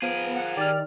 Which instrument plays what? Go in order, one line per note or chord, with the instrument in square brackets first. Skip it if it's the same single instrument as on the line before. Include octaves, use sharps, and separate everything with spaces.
[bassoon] F3 [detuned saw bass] B3 [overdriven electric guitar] G#4 A#4
[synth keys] F#5
[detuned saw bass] D#3 [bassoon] G4 [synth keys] D5 F6